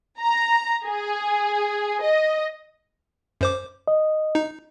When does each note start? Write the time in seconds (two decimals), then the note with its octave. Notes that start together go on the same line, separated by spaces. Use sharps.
0.20 A#5
0.86 G#4
2.02 D#5
3.41 F#2 C5 D6
3.88 D#5
4.35 D#4